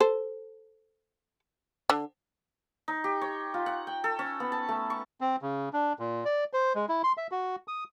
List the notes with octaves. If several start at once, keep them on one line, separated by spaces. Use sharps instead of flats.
A4 C5
D3
D#4
G4
C#5
F4
F#5
G5
A4
C#4
B3
A5
A3
C#6
C4
C#3
D4
A#2
D5
C5
G#3
E4
C6
E5
F#4
D#6